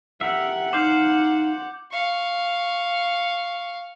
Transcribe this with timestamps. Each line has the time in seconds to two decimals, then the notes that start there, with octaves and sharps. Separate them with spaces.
0.21 G4 A#4 E5 F#5
0.73 D#4 C5 F5 D6 G6
1.92 F5 C#6